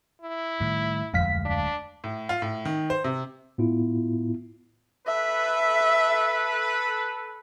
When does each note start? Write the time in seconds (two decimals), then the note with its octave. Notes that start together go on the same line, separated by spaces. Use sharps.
0.22 E4
0.60 A2 D#3 G3
1.13 D1 G1 F2 G#3 F5 B6
1.45 D4
2.04 A2
2.29 F4
2.42 A2
2.65 D#3
2.90 C5
3.04 C3
3.58 A2 B3 E4 F4
5.07 A4 B4 E5